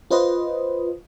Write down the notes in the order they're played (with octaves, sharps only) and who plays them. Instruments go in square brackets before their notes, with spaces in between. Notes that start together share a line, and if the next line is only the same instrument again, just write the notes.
[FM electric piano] F4 B4 C5 D#5